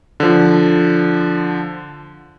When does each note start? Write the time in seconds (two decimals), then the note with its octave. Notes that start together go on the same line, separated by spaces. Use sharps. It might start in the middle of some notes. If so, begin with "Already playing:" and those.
0.20 D3 F3